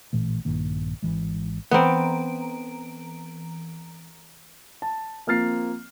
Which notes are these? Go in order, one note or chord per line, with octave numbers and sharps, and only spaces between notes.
A1 A#2 E3 A3
A#1 G2 D#3 A#3
G#1 E3 G#3
E3 B3 C4 A#5 D7
A5
F3 A#3 C4 F6 A6 C7